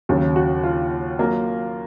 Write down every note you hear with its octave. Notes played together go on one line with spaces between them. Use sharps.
D#2 C#3 F#3
F#4
F4
F#3 A#3